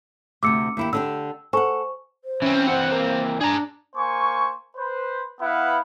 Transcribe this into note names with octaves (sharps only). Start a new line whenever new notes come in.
D2 C3 D6 E6 C#7
D#2 E4 G4
D3 D4 G4 E6
A4 C5 F#5 G#5 C#6
C5
E3 C4 C#4
F#5
A#3
D4 G#4 A#5
A#3 C5 G#5 C#6
B4 C5
B3 E4 B4 F5 F#5